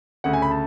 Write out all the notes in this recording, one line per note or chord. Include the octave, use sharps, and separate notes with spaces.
D2 C#3 F#5
G#5
B5
A5